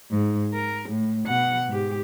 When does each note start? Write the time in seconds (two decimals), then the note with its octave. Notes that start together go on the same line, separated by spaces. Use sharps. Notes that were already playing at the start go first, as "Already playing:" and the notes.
0.11 G#2
0.54 A#4
0.89 A2
1.27 B2 F#5
1.68 G#2 G4